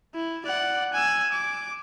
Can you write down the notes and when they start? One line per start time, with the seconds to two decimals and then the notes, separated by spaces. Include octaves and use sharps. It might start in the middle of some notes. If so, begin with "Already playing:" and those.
0.15 E4
0.46 D5 F#5
0.94 G#5 E6
1.33 D6